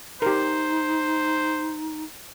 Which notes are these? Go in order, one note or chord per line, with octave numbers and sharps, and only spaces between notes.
D#4 G4 A#4 C5